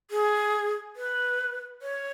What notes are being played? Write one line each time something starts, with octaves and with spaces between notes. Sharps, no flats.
G#4
B4
C#5